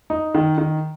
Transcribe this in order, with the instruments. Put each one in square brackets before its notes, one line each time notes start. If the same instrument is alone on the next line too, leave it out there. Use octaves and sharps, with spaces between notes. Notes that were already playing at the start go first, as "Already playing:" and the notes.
[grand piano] D#4
D#3
D#3